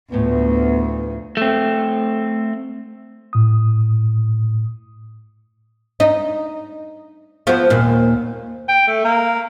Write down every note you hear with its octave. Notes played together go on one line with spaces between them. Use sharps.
D2 A2 D3 F3 B3
A3 C4
A2 D#6
D#4
F3 B3
D#2 A#2
G5
A3
A#3